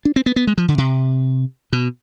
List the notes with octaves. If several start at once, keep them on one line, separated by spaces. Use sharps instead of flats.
D4
C4
B3
B3
G#3
F3
D3
C3
B2